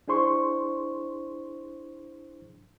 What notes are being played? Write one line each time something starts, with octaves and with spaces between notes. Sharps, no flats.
D4 E4 G#4 C5 C6 C#6